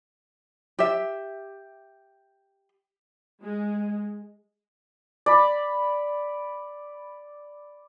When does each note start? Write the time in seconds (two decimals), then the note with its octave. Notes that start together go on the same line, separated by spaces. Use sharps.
0.79 G4 E5
3.42 G#3
5.26 D5 B5